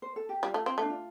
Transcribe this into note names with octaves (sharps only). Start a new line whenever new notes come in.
C5
A4
G4
G3 F4
A3
C4
A3 D4
F4